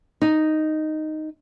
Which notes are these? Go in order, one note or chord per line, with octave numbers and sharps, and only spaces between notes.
D#4